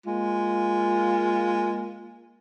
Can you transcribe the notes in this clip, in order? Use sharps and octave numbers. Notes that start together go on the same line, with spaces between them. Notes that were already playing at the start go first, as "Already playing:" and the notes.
G#3 A#3 F4